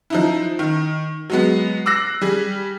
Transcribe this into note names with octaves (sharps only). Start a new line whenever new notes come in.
F3 D#4 E4
D#3
F#3 G#3 B3
D6 E6 F#6 A#6 C7
G3 G#4